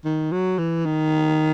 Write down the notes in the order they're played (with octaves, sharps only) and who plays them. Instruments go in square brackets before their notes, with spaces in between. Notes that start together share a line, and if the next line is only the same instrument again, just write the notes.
[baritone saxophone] D#3
F#3
E3
D#3